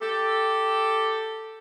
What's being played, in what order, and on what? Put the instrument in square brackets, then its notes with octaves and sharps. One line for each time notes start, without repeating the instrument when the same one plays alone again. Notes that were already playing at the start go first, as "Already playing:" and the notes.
[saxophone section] G4 A4